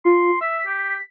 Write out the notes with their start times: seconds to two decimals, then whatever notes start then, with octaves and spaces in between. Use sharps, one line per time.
0.05 F4 C6
0.41 E5 B6
0.67 G4